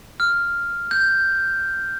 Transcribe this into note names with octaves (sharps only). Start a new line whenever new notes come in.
F6
G6